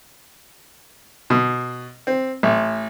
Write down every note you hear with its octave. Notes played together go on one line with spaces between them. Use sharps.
B2
C4
A1